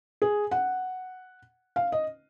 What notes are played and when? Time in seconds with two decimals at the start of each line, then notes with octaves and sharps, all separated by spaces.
0.22 G#4
0.51 F#5
1.76 F5
1.92 D#5